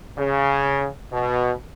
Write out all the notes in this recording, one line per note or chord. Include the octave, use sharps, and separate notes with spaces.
C#3
B2